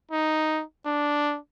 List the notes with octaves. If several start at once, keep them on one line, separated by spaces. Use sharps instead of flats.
D#4
D4